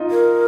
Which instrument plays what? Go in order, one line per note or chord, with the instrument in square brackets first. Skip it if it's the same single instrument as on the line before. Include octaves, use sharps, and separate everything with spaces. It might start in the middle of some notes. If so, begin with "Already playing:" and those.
Already playing: [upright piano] D#4 F4
[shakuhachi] A#4